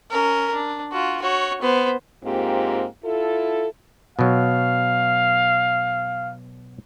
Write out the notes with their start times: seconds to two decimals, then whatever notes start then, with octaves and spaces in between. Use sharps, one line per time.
0.11 C#4 A#4
0.55 D4
0.92 F4 F#4
1.21 F#4 C#5
1.61 B3 C5
2.24 G#2 A#3 C4 F4 G4
3.05 E4 F4 A4
4.19 B2 F#3 F5